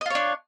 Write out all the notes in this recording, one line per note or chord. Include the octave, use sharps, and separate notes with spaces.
D4 F4 C#5 D#5